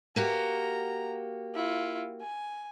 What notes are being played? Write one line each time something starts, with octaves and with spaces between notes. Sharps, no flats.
A#3 F#4 G4 A#5
E4 F4
G#5